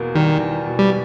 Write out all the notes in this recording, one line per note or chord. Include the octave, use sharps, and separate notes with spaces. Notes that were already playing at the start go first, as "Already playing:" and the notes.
Already playing: E2 B2 A#3
D#3 G3
E2
B2
G3